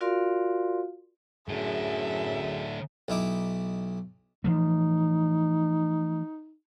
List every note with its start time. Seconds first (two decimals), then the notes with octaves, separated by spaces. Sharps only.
0.01 F4 F#4 A#4 D5 F5 C6
1.49 F#2 A2 D3 G#4 E5
3.08 B1 D#4 E4 D6
4.44 E3 F3 A3 D#4